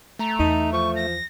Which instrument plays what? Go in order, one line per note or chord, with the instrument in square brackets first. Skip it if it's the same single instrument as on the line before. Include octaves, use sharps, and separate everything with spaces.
[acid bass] A3 [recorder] A#5
[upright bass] E2 [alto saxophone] D#4
[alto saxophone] F3 [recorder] C#6
[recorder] A#6